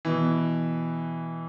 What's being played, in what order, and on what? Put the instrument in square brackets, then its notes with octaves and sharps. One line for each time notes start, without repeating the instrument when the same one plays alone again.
[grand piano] B2 E3